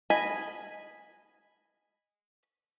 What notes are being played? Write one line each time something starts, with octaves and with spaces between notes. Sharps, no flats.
D#5 G#5 B5